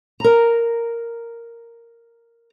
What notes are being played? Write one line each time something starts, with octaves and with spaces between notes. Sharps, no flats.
A#4 A#5